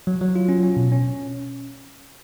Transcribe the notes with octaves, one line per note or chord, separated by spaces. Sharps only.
F#3
F#3
F4
C#4
C#4
B2
C#4